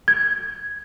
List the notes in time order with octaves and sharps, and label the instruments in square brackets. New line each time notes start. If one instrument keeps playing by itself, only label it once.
[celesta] G#6